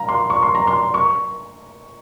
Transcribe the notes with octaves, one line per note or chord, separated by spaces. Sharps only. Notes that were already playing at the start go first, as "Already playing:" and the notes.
Already playing: F5 A#5
C6
C#6
C6
A#5
C6
C#6